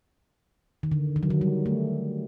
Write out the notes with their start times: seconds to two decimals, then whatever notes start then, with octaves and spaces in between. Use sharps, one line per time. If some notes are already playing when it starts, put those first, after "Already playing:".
0.83 D#3
0.92 D3
1.16 D#3
1.23 F#3
1.30 D#3
1.41 G3
1.66 A3